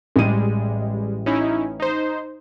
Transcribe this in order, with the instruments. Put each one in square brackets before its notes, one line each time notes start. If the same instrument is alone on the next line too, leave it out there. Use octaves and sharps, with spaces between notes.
[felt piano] A1 D#7 [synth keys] G3 G#3
[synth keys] C#4 D#4 E4
D#4 C5